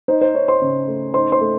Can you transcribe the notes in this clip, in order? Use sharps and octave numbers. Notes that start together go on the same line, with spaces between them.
D#4 C5
C5
D#4 C#5
C5 C6
C#3
A3
D#4 C5 C6
C5 C6
A3